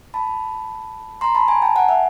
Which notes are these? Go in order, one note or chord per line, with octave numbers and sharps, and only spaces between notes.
A5 B5
A#5 C6
A5 B5
G#5 A#5
G5 A5
F#5 G#5
E5 F#5